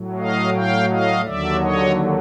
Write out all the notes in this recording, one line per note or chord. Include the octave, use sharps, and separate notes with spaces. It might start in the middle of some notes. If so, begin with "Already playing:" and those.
Already playing: A2 F#3
D#5 F5
F5 G5
D#5 F5
D#2 D3 F#3 D5 E5
C#5 D#5